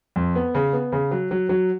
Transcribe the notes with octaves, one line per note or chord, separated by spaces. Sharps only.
F2
B3
C#3
B3
C#3
F#3
F#3
F#3